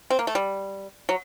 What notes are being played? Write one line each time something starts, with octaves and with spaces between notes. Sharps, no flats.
C4
A#3
A3
G3
F#3